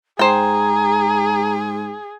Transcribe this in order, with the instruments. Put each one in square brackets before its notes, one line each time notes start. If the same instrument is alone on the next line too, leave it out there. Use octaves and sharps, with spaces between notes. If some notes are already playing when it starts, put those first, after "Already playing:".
[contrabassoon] G#2 [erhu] G#4 [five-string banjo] C5 G5 [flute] A#5